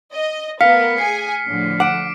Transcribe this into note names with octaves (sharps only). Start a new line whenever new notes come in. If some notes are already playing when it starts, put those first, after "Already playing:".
D#5
A3 B3 A#4 F5 F6 B6 C#7
G#4 G#5 C7
A2 D3 F3
F#5 D6 D7